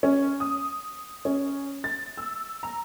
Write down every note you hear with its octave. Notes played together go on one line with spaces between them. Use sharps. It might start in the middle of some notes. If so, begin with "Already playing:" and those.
C#4
D#6
C#4
A6
E6
A#5